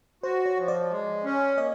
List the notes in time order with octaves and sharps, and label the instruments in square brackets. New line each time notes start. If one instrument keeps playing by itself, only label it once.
[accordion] F#4 [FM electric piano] C5
[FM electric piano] C#5
[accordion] F3
[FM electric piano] D5
[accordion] G#3
C#4
[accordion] A#3 [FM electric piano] D#5